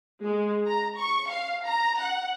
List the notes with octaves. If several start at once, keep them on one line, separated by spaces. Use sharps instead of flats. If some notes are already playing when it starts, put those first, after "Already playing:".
G#3
A#5
C#6
F5
A#5
F#5